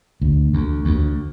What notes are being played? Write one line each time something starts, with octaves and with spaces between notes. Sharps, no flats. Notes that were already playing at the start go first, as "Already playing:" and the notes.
D2
D2
D2